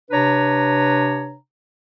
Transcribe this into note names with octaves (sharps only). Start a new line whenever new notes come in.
C3 D4 B4 C#5 A#5